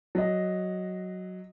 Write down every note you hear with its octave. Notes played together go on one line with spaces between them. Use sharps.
F#3 D#5